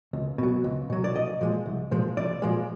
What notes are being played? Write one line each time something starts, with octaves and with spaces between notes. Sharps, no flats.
C#2
B2 F#3
C#2
B2 F#3
D5
C2 D#5
A#2 F3 G#3
C2
A#2 F3 G#3
C2 D5
A#2 F3 G#3